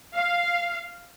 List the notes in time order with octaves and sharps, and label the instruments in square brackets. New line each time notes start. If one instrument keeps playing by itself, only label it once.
[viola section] F5